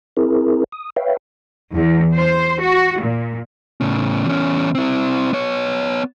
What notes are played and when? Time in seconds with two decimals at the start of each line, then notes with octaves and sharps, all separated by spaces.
0.17 C4 E4 G#4 A#4
0.72 D#6
0.96 B4 C#5 E5 F5 G5
1.73 E2
2.14 C5
2.59 F#4
3.00 A#2
3.81 A2 C#3
4.26 E2 C#4
4.75 C4 E4
5.33 B3 C#5